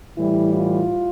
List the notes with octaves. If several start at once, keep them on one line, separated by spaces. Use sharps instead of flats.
A2 E3 G3 E4
F4